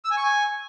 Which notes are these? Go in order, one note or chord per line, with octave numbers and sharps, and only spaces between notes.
E6
G#5
C#6
G#5